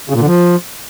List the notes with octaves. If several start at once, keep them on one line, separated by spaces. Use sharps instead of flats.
C#3
A#2
D3
F3